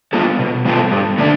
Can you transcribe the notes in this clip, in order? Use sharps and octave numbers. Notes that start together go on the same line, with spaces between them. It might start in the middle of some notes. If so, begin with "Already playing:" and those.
G3 B3 F4 A4
B2
G3 B3 F4 A4
G2
D3 A3 D4